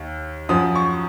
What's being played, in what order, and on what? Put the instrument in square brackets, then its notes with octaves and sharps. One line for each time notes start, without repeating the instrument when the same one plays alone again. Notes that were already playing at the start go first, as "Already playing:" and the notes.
Already playing: [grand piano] D#2
F#2 F3 D#6
C#6